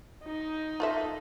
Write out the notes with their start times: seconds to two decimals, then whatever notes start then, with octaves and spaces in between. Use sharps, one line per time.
0.24 D#4
0.80 F4 A4 E5